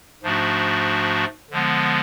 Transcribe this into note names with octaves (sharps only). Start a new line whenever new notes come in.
G#2 F3 A3 D4 F#4
D3 F3 G#3 B3